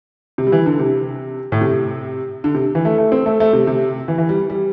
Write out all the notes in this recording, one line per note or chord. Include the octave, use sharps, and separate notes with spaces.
C3
G3
E3
D3
C3
A2
C3
D3
C3
E3
A3
A3
C4
A3
A3
C3
C3
E3
E3
G3
G3